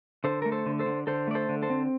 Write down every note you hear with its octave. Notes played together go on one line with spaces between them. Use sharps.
D3 A4 C5
A3 A#4
A4 C5
D3
A4 C5
D3
D3 A4 C5
A3 D5
A4 C5
D3
A4 C5
C4